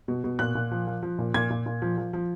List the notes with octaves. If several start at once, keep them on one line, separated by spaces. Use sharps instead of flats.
B2
B2
A#2 F#6
A#2
F3
F3
F3
A#2
A#2 G#6
A#2
A#2
F3
F3
F3